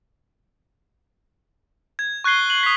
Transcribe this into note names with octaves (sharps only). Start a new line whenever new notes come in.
G#6
C#6 F#6 G#6 C7 G7
F#7
D#6 B6